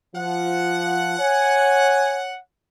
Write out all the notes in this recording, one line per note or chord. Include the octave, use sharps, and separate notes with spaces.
F3 F#5
C#5 G#5